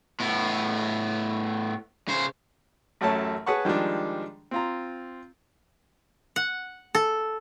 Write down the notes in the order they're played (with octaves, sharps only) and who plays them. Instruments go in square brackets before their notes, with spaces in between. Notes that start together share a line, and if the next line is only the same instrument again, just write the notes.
[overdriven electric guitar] A2 B3
C#3 C5
[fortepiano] A1 F#2 A3 C#5 A5
G#4 B4 C#5 F#5 A5 C#6
D#3 F3 G3 G#3 D4
C4 F4 A#5
[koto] F#5
A4